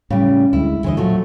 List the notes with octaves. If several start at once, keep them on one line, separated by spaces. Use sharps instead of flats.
A2 C#3 G3
D2 D3 G#3 E4
E2 G2 D3 E3 C5 D#5
A#2 F3 F#3 A3